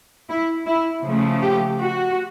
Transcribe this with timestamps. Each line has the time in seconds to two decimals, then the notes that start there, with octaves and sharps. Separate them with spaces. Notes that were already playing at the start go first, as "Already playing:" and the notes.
0.29 E4
0.66 E4
1.05 C#3 F3 A3
1.41 G4
1.80 F#4